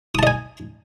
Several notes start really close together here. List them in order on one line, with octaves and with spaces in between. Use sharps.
D#6 A5 D#5 G#5